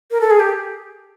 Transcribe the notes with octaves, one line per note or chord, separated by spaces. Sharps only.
A#4
A4
G#4
G4